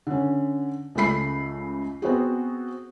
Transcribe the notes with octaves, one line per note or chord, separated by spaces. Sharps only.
D3 C#4
C#2 C#3 A3 B5 C7
B3 C4 F#4 G#4